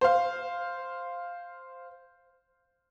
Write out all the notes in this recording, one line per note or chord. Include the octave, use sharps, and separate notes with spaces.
C5 F5